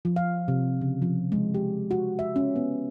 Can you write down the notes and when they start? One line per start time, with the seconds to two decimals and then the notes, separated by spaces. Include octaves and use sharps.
0.05 F3
0.16 F5
0.48 C3
0.81 C#3
1.02 F3
1.32 G#3
1.54 G4
1.91 F#4
2.19 E5
2.36 C#4
2.56 B3